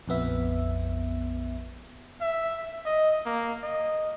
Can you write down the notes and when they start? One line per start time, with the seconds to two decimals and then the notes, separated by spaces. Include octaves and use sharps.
0.08 A#1 F2 B3 E5
2.21 E5
2.86 D#5
3.26 A#3
3.63 D#5